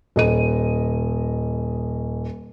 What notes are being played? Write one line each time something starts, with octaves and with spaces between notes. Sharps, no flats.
D#1 D#5 D#7